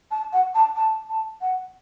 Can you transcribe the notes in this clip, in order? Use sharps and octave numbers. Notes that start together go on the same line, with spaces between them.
A5
F#5
A5
A5
A5
F#5